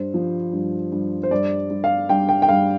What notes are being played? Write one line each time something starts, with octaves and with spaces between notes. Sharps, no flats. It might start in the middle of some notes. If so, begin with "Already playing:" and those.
Already playing: G2 C5
F3
G2
G2
C5
G2 D5
G2
F5
G2 G5
G5
G5
G2 F5